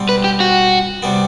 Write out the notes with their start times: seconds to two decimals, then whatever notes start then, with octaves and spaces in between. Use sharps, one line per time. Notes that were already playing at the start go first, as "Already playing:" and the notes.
Already playing: B2 G3 C4
0.09 B4
0.24 G4
0.40 F#4
1.03 C3 G3 B3